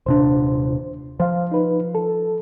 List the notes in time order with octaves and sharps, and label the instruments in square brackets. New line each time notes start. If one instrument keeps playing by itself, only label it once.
[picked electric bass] D#1 C3 D4 [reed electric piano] C5
[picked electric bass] F3 [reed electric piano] C5 F5
[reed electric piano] D#4 B4
A4